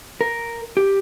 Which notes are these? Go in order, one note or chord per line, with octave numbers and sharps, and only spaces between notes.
A#4
G4